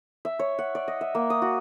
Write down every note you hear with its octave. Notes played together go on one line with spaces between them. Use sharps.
E5
C#5
F#5
D5
D#5
E5
A#3
D#6
F#4